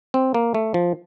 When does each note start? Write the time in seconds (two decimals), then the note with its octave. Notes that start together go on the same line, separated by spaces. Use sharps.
0.14 C4
0.34 A#3
0.54 A3
0.74 F3